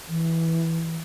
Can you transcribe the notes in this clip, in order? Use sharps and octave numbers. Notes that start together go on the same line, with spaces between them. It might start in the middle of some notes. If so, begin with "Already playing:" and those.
E3